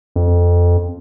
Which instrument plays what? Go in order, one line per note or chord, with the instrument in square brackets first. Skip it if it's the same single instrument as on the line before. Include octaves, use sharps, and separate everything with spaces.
[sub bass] F2